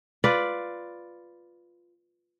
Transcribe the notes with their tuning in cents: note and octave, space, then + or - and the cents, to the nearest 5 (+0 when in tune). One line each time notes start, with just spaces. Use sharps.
F4 +0 B4 +0 D5 +0